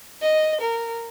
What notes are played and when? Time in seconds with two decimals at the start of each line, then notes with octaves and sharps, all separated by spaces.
0.22 D#5
0.61 A#4